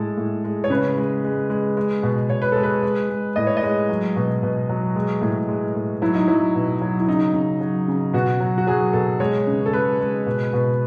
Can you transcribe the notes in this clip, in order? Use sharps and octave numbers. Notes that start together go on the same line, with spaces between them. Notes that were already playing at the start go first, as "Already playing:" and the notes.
Already playing: A2 G#3 A4
A2
G#3
C#5
C#3 B4
G#3
G#3
G#3
G#3
B2
B2 C#5
B4
G#3 A4
B4
G#3
G#3
A2 D#5
C#5
D#5
G#3
F#3
B2
B2
F#3
G#3
A2
G#3
A2
F#3 E4
D#4
F#3 E4
B2
F#3
E4
C#3 D#4
C#3
F#3
C#3
B2 F#4
F#3
F#4
F#3 G#4
B2 A4
G#3 C#5
C#3
A4
G#3 B4
G#3
B2
B2